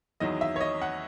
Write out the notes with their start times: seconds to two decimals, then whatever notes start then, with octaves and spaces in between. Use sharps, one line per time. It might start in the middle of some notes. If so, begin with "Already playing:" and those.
0.20 E2 D#3 F#3 D#5
0.41 E5
0.56 C#5
0.60 D#5
0.81 F#5